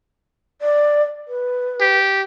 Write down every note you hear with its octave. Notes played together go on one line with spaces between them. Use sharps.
D5
B4
G4